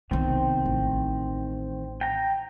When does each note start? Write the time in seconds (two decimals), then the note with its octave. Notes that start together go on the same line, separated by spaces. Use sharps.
0.11 B1 C3 D#3 C4
0.65 A1
2.01 G5 A#5